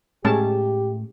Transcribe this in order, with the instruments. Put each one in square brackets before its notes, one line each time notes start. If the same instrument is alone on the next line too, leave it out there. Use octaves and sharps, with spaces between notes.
[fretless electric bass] A2 A3 [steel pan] G#3 C#4 A5 [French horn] G4